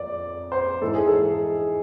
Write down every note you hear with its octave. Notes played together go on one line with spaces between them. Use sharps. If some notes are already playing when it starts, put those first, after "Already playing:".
Already playing: F2 D5
C5
G#2 E3 A4
G#4
A4